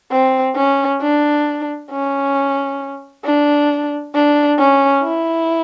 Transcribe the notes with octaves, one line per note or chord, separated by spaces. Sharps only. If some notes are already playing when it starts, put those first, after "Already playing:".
C4
C#4
D4
C#4
D4
D4
C#4
E4